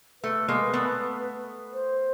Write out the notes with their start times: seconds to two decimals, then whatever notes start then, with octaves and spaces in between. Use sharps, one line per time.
0.22 A3 B4
0.48 G#3 A#3
0.73 A3 B3
1.73 C5